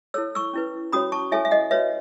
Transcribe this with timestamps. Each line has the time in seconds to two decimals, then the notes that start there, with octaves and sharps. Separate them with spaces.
0.14 E4 A4 C#5 E6
0.35 C#6 E6
0.53 C#4 E4 B4
0.92 C#4 F#4 C#5 B5 D#6
1.12 A5 C#6
1.32 E4 A4 C#5 E5 G#5
1.45 E5
1.51 D#5 F#5
1.71 F#4 B4 C#5 E5